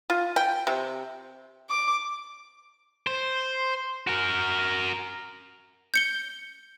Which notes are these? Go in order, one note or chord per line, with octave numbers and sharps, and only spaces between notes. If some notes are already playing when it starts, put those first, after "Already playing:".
F4
G5
C3
D6
C5
F#4 A#4
G6 C#7 G7